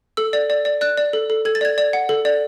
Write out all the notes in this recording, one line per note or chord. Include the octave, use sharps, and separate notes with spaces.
A4 E6
D5
D5
D5
D5 F#6
D5
A4
A4
A4 G#6
A6
D5 G#6
D5
F#5
A4
D5